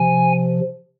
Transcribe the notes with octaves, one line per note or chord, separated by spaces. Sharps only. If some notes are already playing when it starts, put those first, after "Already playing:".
Already playing: C3 F3 G#5